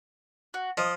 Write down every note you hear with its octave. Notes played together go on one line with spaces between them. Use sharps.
F#4
F3 D#5